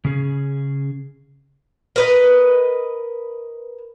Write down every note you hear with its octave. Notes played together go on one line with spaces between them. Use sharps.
C#3 C#4 G#4
A#4 B4 D#5